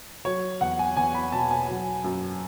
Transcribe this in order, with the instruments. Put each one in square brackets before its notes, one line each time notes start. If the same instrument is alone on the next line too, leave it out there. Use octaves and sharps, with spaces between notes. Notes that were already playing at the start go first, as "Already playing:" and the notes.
[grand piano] F#3 C#5
E2 F#5
G#5
E2 G#5
B5
B2 A5
G#5
F#3
F#2